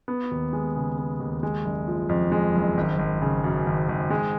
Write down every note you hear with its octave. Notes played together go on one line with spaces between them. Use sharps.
B3
D#2
G#3
C#3
B3
D#2
G#3
F#1
F3
F2
G#3
F#1
G#1
G#1
C#3
F#2
G#1
G#1
G#3